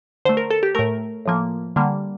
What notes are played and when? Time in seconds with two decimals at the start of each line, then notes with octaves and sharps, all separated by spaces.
0.25 D3 A3 C5
0.37 A#4
0.51 A4
0.63 G4
0.75 A2 A3 A#4
1.26 A2 F3 A#3
1.76 D3 G3 A#3